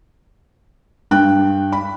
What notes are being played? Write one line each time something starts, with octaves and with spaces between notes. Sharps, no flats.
G2 G5 F#6
B5